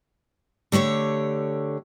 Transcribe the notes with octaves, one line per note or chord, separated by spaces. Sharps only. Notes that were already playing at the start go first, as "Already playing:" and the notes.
D3 A3 G4 C#5